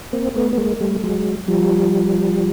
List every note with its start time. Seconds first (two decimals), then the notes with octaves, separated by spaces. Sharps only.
0.13 A#3 C4
0.36 A3 B3
0.53 B3
0.58 G#3 A#3
0.81 G3 A3
1.03 F#3 G#3
1.48 F3 G3